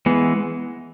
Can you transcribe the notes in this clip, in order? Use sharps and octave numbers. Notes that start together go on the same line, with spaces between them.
E3 G#3 B3